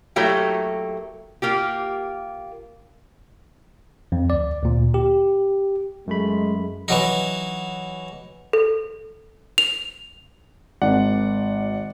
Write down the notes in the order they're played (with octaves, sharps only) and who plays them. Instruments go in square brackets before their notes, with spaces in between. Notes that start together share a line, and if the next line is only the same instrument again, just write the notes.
[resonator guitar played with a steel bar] F#3 A3 A#3 E4 G4
A#3 F4 G4
[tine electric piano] F2
D2 D5
D2 A#2
G4
[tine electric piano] F#2 A3 B5 [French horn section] G#3
[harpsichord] E3 F#3 D#4
[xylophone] A4
F7
[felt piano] G#1 [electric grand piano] D5 F#5